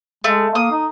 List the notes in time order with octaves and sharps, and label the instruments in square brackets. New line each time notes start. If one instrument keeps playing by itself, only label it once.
[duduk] G#3 [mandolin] A3
[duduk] A#3 [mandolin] D#6
[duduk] D#4